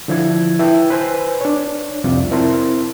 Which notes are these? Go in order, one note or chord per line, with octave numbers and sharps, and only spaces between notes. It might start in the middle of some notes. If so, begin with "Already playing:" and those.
D3 F3 E4 G#6
E4 B4 G5 A5
B4 C5 G#5
D4 C#5
C2 F2 C3 F4 D5
C4 E4 A#4 A5 C6